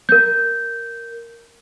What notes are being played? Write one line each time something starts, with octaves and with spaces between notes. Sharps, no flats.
A#4 G6